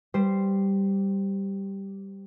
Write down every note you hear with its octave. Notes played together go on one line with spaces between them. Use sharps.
G3 C5